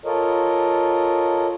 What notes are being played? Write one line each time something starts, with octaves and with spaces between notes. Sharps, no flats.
F4 A4 A#4 C#5 D#5